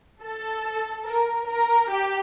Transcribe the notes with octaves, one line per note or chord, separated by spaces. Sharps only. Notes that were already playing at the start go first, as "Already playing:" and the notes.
A4
A#4
A#4
G4